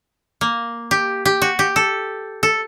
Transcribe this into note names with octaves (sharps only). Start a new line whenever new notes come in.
A#3
G4
G4
F#4
G4
A4
A4